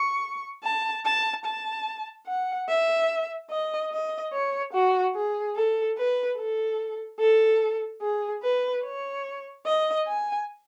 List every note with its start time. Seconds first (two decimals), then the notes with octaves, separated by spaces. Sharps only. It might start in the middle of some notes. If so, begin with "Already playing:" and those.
Already playing: C#6
0.64 A5
1.05 A5
1.45 A5
2.27 F#5
2.69 E5
3.50 D#5
3.92 D#5
4.33 C#5
4.73 F#4
5.15 G#4
5.56 A4
5.97 B4
6.38 A4
7.20 A4
8.02 G#4
8.43 B4
8.84 C#5
9.66 D#5
10.07 G#5